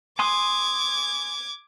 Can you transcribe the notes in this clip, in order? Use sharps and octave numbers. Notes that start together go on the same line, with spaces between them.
G#5 C6 D6 D#6 G#6